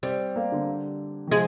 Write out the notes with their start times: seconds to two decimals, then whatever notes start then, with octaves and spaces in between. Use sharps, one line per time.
0.03 G3 C4
0.36 A#3
0.52 D3
1.27 D#3
1.31 F3 G#3